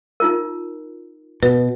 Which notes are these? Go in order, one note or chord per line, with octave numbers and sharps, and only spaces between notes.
D#4 F4 A#4
B2 B4